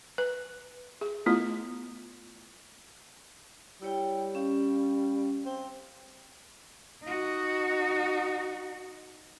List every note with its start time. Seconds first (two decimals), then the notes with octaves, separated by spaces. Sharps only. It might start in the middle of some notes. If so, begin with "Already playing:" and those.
0.18 B4
1.01 G#4
1.26 A3 B3 E4 F4
3.82 G3 E4 C#5 G5
4.35 C#4 G4 F5
5.46 C4
7.03 D#4 F#4